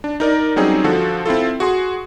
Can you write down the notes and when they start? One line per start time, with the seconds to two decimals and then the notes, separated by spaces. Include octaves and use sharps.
0.04 D4
0.20 D#4 A#4 D5
0.56 F#3 G3 C4 C#4 D#4 G#4
0.84 D3 F3 F#4 A4
1.26 C4 E4 F4 A4
1.60 F#4 G#4 C6